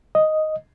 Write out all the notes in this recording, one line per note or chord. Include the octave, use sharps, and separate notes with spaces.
D#5